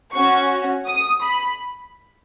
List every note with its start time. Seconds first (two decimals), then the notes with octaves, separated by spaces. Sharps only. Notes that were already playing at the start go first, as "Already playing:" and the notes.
0.13 C#4 F#4 C#6
0.87 D#6
1.22 B5